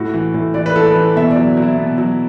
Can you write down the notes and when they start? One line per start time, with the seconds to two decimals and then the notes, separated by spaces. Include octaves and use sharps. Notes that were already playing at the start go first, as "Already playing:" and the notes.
Already playing: A2 F#4
0.14 E3
0.34 A2
0.54 E3 D5
0.66 B4
0.76 E3 A4
0.87 B4
0.96 E3
1.16 B2 E5
1.31 D5
1.36 F#3
1.57 F#3
1.62 E4
1.78 B2
1.98 F#3